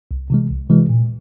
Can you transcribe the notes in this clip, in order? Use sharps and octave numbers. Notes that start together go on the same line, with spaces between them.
C2
C3 E3 G#3
C2
C3 E3 G#3
A#2